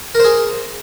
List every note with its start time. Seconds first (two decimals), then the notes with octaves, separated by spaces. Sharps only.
0.15 A#4
0.20 C5
0.25 G#4